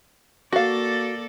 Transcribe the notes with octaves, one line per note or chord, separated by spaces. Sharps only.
A#3 F#4 A4 D5 F5